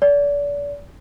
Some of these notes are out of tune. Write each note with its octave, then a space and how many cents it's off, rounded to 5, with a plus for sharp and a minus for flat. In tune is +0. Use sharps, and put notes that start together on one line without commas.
D5 -35